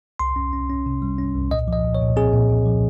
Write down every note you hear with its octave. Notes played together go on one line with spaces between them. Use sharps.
C2 C6
C#4
C#4
C#4
C3
G3
C#4
C2
A#2 D#5
F3 D#5
A#2
C#5
A#2
C4 G#4
A#2
A#2
F3